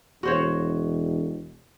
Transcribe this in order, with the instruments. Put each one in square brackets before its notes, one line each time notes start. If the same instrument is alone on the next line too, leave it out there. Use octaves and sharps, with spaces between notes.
[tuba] E1 [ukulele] F#4 C5 C#5